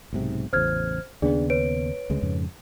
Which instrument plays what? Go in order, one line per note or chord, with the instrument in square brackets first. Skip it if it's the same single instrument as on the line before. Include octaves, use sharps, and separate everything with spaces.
[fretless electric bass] B1 G#2 C3
[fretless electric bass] A1 E2 C#3 [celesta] C5 F6 G#6
[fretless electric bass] D#2 C#3 B3 [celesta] D4 G#4 D5
[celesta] B4 C#5 D7
[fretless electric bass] D2 C#3 G#3
F2 G#2 C#3